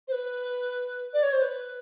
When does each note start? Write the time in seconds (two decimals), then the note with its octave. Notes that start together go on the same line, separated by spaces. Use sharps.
0.08 C5
0.12 B4
1.13 D5
1.23 C#5
1.32 C5
1.42 B4